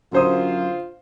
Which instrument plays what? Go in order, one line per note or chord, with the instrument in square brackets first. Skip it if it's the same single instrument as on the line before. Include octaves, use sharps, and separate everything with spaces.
[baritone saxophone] F#2 [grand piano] D3 C5 D#6 [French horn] F4